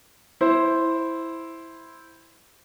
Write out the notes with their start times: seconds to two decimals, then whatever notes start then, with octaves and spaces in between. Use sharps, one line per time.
0.41 E4 C5